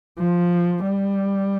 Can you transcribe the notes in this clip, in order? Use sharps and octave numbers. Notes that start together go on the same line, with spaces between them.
F3
G3